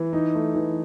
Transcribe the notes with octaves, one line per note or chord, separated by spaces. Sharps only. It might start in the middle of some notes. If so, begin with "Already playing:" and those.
Already playing: E3
D#4
A3
E3